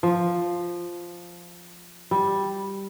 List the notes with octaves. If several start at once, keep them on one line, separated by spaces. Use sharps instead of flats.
F3
G3